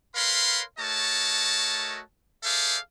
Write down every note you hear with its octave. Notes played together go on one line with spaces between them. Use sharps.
A#4 B4 C#5 F5 B5 C6
A3 F#4 A#4 C#5 D#5 A5
G#4 A4 C5 D5 E5 F5